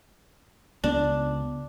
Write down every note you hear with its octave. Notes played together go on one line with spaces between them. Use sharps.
C#2 C#3 B3 D4